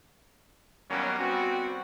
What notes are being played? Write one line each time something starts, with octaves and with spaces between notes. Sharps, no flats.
D#3 F#3 G3 A#3 B3 C#4
G3 B3 C4 F#4